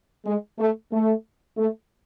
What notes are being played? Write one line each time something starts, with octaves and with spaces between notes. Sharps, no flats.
G#3
A3
A3
A3